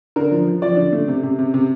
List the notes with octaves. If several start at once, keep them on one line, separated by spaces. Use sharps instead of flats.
D3 A#4
F3
F3
F3 D5
D3
A3
C3
C3
C3
C3